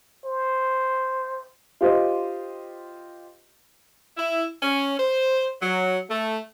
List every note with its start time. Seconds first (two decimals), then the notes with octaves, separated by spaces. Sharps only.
0.25 C5
1.81 F4 G4 C5 D#5
4.17 E4
4.62 C#4
5.00 C5
5.62 F#3
6.10 A3